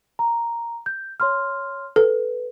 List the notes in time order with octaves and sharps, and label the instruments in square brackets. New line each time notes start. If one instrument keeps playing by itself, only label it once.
[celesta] A#5
G6
C#5 C6 F6
[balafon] A4 [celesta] B4